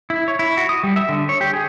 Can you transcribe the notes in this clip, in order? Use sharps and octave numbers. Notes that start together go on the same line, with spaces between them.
E4
C#5
E4
F#4
D#6
G3
E5
D3
C#5
G4
G#4